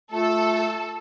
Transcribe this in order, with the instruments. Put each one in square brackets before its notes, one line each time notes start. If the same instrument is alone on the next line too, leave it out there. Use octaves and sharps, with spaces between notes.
[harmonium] A3 [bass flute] F4 [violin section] A4